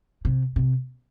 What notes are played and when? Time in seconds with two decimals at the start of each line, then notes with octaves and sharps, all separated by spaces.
0.25 C3
0.56 C3